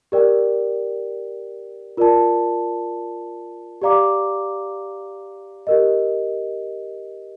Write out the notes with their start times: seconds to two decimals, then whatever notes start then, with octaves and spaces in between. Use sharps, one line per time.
0.12 G4 A#4 D5 G5
1.97 F4 A#4 D5 A5
3.82 G4 D5 F5 A#5 D6
5.67 G4 A#4 D#5